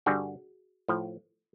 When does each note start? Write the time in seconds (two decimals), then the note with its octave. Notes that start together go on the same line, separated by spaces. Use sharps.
0.06 G2 D3 G3 F#4 G#4
0.88 A2 F3